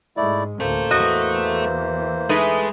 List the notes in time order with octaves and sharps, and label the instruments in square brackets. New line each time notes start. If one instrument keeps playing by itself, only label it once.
[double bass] G#2 G#3 [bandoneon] A3 E4 D5
[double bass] A1 D2 [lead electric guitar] A3 A4 [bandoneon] A#3 C5
[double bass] E2 E3 [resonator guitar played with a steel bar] F#4 D#5
[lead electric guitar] G#3 [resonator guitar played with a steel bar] A3 D#4 B4